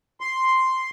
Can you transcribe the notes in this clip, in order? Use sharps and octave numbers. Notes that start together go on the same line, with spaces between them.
C6